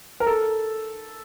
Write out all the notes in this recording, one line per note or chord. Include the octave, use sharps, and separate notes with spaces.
A#4
A4